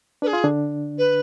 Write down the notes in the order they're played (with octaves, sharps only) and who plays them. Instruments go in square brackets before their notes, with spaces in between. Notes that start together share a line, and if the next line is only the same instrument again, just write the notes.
[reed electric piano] D4 [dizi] B4
[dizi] G#4
[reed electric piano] F4
D3 D4
[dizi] B4